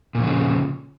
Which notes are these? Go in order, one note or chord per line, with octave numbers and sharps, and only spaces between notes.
A#2 C#3 F3